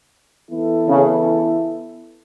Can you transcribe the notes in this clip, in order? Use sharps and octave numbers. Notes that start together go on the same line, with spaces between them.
E3 B3 E4 A4
C#3